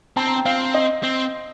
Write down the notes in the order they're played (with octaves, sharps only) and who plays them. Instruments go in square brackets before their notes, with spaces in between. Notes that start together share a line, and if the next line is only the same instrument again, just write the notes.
[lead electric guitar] C4 [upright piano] A5
[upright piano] A#5
G5
[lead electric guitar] C4 [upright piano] F5
[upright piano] D#5
[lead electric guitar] C4